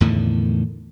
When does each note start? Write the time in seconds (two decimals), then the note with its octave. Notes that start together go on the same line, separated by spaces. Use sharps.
0.01 E2 A2 D3 D#3